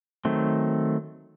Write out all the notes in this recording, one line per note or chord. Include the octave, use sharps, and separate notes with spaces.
D#3 F#3 A3 C4